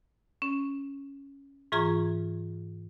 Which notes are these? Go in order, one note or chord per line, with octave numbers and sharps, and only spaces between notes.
C#4
G#2 E3 F4 G#4 A#5 C#6